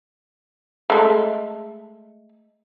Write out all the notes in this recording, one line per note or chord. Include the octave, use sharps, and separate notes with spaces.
G#3 A3